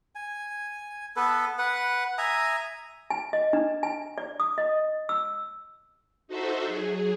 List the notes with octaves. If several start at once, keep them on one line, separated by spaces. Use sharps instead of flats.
G#5
B3 A4 B4
B4 F#5
E5 G#5 A#5 D#6
G#5
D#5
D4
G#5
D5
D#6
D#5
E6
D#4 F#4 A4 C5 E5
F#3 G#4